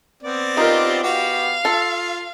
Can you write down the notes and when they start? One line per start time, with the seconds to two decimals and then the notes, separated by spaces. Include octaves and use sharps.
0.23 B3 C4 D5
0.57 D#4 F4 G4 A#4
1.03 B3 F#4 G4 F5
1.65 F4 A4